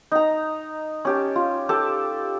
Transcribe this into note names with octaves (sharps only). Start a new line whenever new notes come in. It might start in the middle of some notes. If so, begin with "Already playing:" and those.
D#4 A#5
C#4 G4 A5
F4
G4 A4 A5